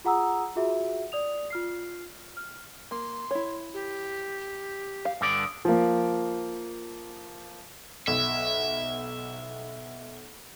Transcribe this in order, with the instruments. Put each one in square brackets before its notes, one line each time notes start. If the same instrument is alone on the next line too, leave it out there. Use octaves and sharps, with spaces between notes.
[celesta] F4 G#4 F#5 A#5 D#6 E6
F4 F#4 G#4 E5
D5 D#6 F7
F4 F6 C7
F6
[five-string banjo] A#3 [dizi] C6
[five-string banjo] E4 C#5
[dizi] G4
[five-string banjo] F5
[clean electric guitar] G2 D3 D5 [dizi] D#6
[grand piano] F3 A#3
[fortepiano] B1 [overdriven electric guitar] E5